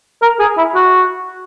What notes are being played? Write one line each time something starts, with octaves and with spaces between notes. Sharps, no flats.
A#4
G#4
E4
F#4